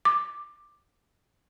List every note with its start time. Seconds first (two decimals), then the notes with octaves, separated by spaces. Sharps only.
0.05 D6